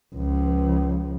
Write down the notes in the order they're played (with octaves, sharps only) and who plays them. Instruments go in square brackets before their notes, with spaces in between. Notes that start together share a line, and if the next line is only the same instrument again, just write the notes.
[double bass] C#2 F3